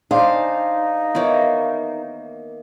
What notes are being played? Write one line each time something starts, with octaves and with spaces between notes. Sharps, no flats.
D4 D#4 G#4 C5 D5 F5
D#3 A#3 B3 E4 C#5